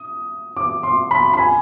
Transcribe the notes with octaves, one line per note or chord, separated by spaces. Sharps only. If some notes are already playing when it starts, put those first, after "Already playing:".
Already playing: D#6
D6
C6
B5
B5
G#5